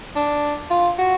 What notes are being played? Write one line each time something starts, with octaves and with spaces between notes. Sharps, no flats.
D4
F4
F#4